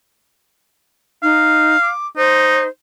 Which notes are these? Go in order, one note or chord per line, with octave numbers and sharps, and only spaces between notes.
D#4 F5
D6
D#4 C5